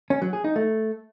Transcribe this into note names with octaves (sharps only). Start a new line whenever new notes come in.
C#4
F#3
G#4
D#4
A3